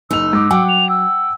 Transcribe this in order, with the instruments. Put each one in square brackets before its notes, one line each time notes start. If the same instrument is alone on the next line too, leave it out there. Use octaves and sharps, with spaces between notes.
[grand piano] F#1 F7 [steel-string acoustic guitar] D#4 [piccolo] E6
[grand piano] G#2 D6
[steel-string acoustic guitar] F#3 [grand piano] F#5 G5 D6
[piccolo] F7
E6